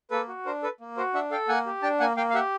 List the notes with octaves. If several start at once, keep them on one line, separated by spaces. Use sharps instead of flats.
A#3 A4 B4
F#4
D4 A#4 C5
A4 B4
A#3
F#4 A#4 C5
D4 E5 F#5
A4 F5 G5
A#3 F#5 G#5
G4
D4 G5 A5
A#3 F#5 G#5
A#3 F5 G5
F5
G4 E5 F#5